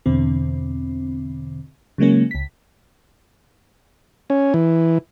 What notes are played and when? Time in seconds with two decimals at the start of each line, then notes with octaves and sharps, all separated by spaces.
0.06 E2 B2 D3 C4
1.98 C#3 F#3 G#3 A#3 C#4
2.31 C#2 B6
4.30 C#4
4.54 E3